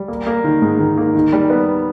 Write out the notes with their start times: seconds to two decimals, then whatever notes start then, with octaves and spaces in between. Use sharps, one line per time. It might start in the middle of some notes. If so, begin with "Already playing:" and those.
Already playing: G3
0.08 A#3
0.27 A#3
0.44 D#3
0.62 G#2
0.79 D#3
0.98 A#3
1.15 D#3
1.33 G3
1.50 B3